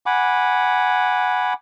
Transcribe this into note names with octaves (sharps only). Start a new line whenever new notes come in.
F#5 G#5 B5 D6